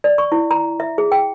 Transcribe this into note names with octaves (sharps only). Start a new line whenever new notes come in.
D5
C#6
E4
A#5
E5
G#4
G5